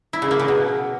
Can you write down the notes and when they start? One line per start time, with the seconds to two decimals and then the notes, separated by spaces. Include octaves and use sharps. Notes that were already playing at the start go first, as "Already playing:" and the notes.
0.13 E4
0.22 C#3
0.31 A#3
0.39 C#3
0.48 B2